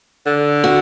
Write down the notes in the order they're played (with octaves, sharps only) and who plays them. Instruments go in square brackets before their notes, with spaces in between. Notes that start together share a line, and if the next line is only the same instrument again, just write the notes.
[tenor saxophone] D3
[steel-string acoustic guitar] F#4